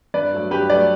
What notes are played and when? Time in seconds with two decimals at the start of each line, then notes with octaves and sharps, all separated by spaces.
0.14 G2 B4 D5
0.33 F#3 A3
0.51 G2 G4 B4
0.70 F#3 B4 D5
0.74 A3